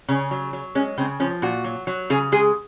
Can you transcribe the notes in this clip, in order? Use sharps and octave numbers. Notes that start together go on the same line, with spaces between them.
C#3 C#4
F#3
F#3
G#3 C#4
C#3 C4
F3 C#4
A#2 F#4
F#3
F#3
C#3 G#4
G#3 G#4